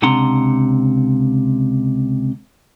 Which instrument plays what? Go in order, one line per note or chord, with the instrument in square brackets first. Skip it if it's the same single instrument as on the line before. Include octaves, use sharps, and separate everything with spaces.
[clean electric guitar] C#2 C3 D4 F#5 A#5 C6